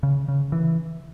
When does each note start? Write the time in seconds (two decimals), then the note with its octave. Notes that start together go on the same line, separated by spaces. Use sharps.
0.03 C#3
0.28 C#3
0.52 E3